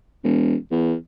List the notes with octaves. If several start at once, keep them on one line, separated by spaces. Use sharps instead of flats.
E1
E2